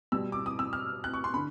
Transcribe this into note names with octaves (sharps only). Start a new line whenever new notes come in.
B2 G3 E6
D6
D#6
E6
F6
F#6
C#6
C6
D3 B5